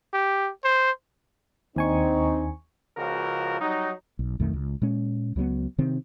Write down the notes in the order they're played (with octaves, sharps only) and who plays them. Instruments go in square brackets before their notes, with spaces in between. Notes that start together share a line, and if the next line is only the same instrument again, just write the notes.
[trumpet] G4
C5
[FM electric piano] D#2 G#5 C#6 [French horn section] C4 D4 D#4
[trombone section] C#2 C#3 F3 F#4 A#4
F#3 G3 D#4
[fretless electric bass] B1
B1 F2 D#3 A3
C#2
A#2 G#3 C#4
C#2 F#3 A3 B3
C3 D#3 C4